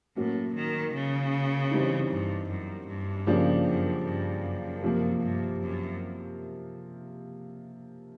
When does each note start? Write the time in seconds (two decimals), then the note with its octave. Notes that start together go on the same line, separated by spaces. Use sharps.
0.16 A2 F#3 A#3 C#4
0.56 D#3
0.94 C#3
1.71 E3 G3 C4 D#4
2.10 G2
2.49 F#2
2.88 G2
3.27 C#3 F3 A#3 D4 G4
3.65 F#2
4.05 G2
4.43 F#2
4.82 C3 F3 A#3
5.21 G2
5.60 F#2